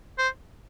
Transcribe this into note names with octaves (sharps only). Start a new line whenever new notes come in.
C5